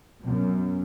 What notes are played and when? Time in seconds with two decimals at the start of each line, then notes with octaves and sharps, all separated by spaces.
0.21 F#2 B2